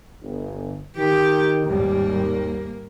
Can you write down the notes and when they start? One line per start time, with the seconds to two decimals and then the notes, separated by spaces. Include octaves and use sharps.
0.21 G1
0.97 D#3 G4
1.67 G#1 D#2 G#2 G3 A#3